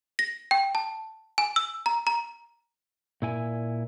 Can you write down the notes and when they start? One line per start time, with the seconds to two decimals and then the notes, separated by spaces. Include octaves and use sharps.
0.19 A#6
0.51 G5
0.75 A5
1.38 G#5
1.56 E6
1.86 A#5
2.07 A#5
3.22 A#2 E4 G#5